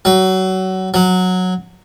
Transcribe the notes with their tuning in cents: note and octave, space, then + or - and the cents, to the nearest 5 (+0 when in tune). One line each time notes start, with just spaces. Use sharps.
F#3 +25
F#3 -10